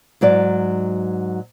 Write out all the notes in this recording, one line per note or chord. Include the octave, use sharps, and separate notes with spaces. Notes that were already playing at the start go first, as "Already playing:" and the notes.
G#2 F#3 D5